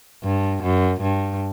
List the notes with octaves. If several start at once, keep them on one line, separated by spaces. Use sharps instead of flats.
G2
F#2
G2